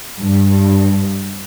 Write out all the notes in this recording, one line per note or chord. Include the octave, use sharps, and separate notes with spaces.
G2